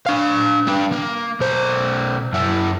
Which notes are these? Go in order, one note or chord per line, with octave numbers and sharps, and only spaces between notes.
D4 F5
G3 D4
A#3
B1 C5
F#2 E4